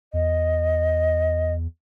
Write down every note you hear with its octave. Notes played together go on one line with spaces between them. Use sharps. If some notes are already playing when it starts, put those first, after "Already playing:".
E2 D#5